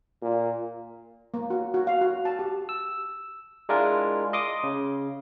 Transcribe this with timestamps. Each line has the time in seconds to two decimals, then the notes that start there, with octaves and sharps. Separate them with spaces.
0.22 A#2
1.34 A#3
1.50 F#4
1.74 F#4
1.87 F5
2.01 F#4
2.25 A5
2.39 G4
2.69 E6
3.69 G#3 D4 E4 F4 A#4
4.33 D#5 C6 D6 D#6
4.63 C#3